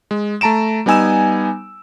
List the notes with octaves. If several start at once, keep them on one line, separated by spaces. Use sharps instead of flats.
G#3
A3 A5 A#5 D7 E7
G3 B3 D#4 G#5 E6 E7